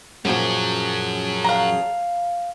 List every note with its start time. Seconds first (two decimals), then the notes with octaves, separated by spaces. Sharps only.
0.25 F#2 A#2 F3 F#3 C#4 G#4 C#5 A5
1.44 F5 A#5